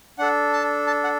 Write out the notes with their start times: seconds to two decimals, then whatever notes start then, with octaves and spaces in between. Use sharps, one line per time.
0.18 D4 A4 F#5
0.53 A5
0.87 A5
1.04 F#5